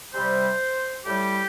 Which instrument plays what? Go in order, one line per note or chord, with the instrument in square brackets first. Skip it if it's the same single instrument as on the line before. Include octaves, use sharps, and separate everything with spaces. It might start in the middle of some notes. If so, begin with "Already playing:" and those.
[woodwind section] C3 G3 C5
A2 G3 G4